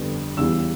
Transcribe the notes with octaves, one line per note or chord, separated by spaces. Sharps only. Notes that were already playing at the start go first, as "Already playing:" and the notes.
Already playing: G1 F2 D3 G3 B3
E2 C#3 E3 G3 E6